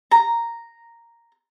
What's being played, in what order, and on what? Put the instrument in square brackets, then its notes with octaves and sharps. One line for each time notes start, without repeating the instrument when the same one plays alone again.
[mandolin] A#5